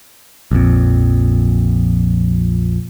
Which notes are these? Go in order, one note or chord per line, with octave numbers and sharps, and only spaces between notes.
A#1 F2